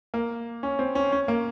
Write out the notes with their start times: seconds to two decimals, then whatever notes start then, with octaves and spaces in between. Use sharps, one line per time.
0.14 A#3
0.63 C#4
0.79 C4
0.95 C#4
1.12 C#4
1.28 A#3